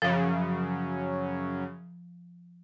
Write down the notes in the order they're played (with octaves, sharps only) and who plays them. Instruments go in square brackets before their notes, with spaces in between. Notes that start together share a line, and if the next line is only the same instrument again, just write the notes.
[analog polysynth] F#2 C#3 [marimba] F3